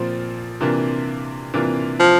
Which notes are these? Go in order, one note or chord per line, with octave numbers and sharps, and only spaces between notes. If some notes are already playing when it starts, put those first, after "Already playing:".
Already playing: A#2 F3 C4
C3 E3 A#3 D4 F4
C3 E3 A#3 D4 F4
F3